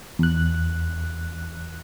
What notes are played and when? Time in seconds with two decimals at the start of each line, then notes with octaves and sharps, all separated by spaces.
0.19 E2 F#6